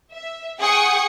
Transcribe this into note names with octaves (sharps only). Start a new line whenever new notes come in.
E5
G#4 F#5 G5 C#6 D#6